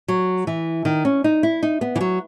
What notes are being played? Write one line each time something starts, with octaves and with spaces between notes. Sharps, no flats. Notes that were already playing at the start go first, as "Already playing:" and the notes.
F#3
E3
D#3
C#4
D#4
E4
D#4
B3
E3
F#3